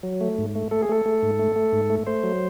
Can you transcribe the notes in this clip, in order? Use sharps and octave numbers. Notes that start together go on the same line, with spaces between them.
F#3
A3
G#2
A3
A3 A4
G#4
A3 A4
A3
G#2
A3
A3
G#2
A3
A3 C5
F#3